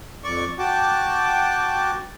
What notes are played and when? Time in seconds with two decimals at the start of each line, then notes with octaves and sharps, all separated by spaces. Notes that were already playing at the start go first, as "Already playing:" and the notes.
0.24 F2 D5 C#6
0.59 F#4 G5 A5 D6